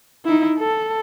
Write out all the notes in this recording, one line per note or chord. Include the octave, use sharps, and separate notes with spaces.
D#4 E4
A4